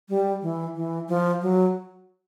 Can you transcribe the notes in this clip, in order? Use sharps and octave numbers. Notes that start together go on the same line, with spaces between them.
G3
E3
E3
F3
F#3